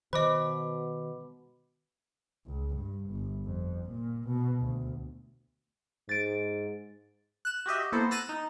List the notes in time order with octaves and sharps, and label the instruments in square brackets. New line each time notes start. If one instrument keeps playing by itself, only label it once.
[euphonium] B2 [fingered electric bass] D#3 [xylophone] C5 D#5 [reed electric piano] B5 D6
[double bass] C#2
G2
G1
F2
A#2
B2
D2
[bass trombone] G#2 [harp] A6 D7
[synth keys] F#6 E7
F#4 G4 D#5 E5
A#3 B3 E4 A4 C5
E6 F#6 A6 A#6 D#7 E7
D#4